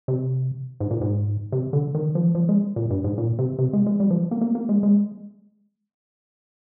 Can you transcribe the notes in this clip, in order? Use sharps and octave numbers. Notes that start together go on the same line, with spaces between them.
C3
G#2
A#2
G#2
C3
D3
D#3
F3
F3
G#3
A#2
G2
G#2
A#2
C3
C3
G#3
G#3
G3
F3
A#3
A#3
A#3
G#3
G#3